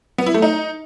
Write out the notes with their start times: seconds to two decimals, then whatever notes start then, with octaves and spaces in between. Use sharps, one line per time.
0.18 B3
0.26 E4
0.34 A3
0.42 D#4